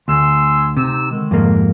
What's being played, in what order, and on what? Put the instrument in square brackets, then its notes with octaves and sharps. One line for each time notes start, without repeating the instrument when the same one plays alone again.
[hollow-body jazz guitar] D2 [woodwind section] G#5 C6 E6
[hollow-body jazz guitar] C3 [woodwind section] C4 D#4 E6
[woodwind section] D3 D#3 G#3
[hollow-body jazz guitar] F2 G#2 A#3